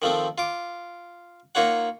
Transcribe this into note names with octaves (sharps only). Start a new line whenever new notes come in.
D#3 F3 A3 C4
F4 D6
A#3 D#4 F4 C#5 F#5